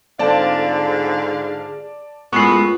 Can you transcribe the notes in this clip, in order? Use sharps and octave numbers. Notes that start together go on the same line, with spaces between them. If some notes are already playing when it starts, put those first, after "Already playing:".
G#2 D3 C4 F4 A4 D5 F5 A5
G#4
F#2 A2 G#3 B3 F4 C#6 C7